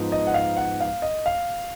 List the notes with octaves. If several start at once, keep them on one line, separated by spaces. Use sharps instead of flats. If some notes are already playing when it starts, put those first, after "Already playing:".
Already playing: G#2 F3 B3 D#4
D#5
F#5
F5
F#5
F5
D#5
F5